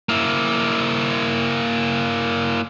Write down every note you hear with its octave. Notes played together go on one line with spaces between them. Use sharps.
A#3 E4